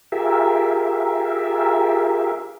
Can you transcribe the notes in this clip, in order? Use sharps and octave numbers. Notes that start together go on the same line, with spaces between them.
F4 G4 G#4 A#4 E5